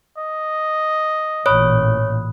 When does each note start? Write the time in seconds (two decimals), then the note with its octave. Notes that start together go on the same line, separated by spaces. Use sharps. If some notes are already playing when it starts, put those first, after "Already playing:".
0.18 D#5
1.46 A1 A#2 C#5 B5 D#6 F#6